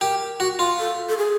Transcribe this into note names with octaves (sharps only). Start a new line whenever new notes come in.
G4 A#4
F#4
F4
A4
A4
G#4